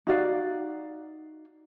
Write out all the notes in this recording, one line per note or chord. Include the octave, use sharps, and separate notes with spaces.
D#4 F#4 D5 F5